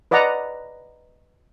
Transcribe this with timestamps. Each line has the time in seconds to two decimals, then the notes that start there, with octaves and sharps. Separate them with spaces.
0.11 B4 D5 D#5 F#5 A#5